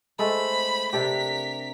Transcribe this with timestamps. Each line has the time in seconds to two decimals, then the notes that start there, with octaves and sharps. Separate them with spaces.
0.19 G#3 A3 A4 C5 B5
0.93 C3 D4 G4 A#4 B6